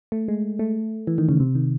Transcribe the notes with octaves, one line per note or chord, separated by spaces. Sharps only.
A3
G#3
A3
E3
D#3
C#3
C3
D#3